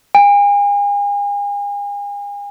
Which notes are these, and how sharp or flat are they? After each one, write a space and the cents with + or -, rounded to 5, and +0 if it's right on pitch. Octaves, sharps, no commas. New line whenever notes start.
G#5 -40